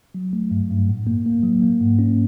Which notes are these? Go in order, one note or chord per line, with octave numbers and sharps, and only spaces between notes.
F#3
A3
G2
G2
A2
A#3
A#3
F#3
A#3
G#2
C#4